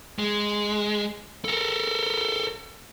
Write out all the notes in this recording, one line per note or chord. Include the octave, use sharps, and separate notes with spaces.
G#3
A4 A#4